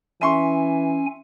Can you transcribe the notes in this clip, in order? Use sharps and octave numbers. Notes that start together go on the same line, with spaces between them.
E3 C#4 E5 G#5 C6 C#6